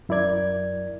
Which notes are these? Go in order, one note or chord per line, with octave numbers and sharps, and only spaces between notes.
F#2 E4 A#4 D5 G#6